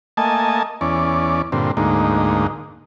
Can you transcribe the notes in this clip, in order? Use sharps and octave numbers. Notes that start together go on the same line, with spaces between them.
A3 A#3 D#5 G#5 A5
E2 C#4 D5
G2 A#2 D3 C4
D2 G#2 A#3 D#4